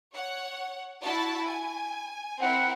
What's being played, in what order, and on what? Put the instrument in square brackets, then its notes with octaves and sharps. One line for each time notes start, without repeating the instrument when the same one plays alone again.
[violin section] C#5 F#5
E4 F#4 A5
G#5
[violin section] C4 E4 A#4 [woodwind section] F#5